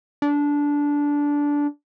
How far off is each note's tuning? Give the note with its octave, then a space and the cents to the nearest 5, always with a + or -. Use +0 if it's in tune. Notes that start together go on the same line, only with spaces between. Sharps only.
D4 -15